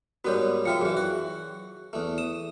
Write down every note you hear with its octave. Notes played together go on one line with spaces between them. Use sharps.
G#2 G3 B3 F#4 A#4 C#5
F3 F4 F#4 E5 G5 C#7
F#2 E3 G#4
F#4
E2 A3
D#6 E7